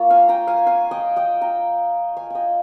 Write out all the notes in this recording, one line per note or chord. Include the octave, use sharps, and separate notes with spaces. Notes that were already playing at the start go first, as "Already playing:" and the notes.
Already playing: A#3 F4 C#5
F5 G#5
G5 A#5
F5 G#5
F5 G#5
D#5 G5
D#5 G5
G5 A#5
F5 G#5
D#5 G5 G#5